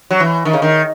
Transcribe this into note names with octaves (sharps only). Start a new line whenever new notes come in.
F#3
E3
D#3
C#3
D#3